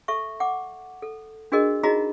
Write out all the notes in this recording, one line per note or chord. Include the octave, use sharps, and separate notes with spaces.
A4 E5 C#6
F#5 D6
A4
D4 F#4 G#4 A#4 D#5
D#4 F4 F#4 G#4 D#5 A#5